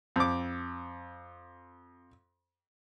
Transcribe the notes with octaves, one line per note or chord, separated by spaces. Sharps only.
F2 D6